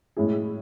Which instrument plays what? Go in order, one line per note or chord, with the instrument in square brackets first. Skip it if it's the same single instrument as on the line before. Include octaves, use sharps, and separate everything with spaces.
[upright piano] A2 G#3 C#4 E4 G#4